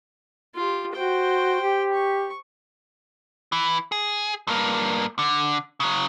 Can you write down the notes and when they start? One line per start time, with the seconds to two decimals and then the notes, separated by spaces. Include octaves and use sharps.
0.55 F4 G4
0.93 F#4 C5 G5
1.61 G4
1.93 C#6
3.52 E3
3.92 G#4
4.47 G2 A#3
5.19 D3
5.80 C#3 F#3